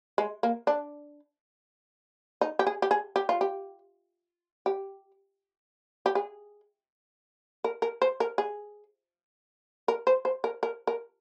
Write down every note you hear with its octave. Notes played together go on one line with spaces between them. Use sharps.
G#3
A#3
D4
D#4
G4
G#4
G4
G#4
G4
F4
G4
G4
G4
G#4
A#4
A#4
C5
A#4
G#4
A#4
C5
C5
A#4
A#4
A#4